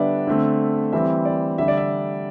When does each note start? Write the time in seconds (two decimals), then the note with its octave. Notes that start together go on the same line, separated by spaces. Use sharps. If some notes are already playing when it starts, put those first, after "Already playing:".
Already playing: D3 G3 B3 D4 D5 E5
0.27 D3 A3 C4
0.92 E3 G3 C4 E5
1.25 D5
1.58 D3 G3 D4 E5
1.68 D5
1.77 E5